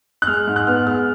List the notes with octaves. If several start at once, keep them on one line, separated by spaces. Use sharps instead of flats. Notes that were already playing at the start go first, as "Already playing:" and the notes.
F#6
G#3 F6
G#2
F#6
B3 F6
G#3 F6